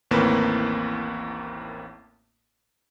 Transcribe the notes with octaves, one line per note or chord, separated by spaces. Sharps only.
A1 D#2 A2 A#3 C4 B4